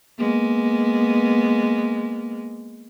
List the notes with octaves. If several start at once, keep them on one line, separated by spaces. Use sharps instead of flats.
G#3 A#3 B3